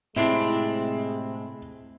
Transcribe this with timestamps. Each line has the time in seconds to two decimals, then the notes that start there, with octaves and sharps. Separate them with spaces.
0.16 A2 C3 G#3 C4 D4 E4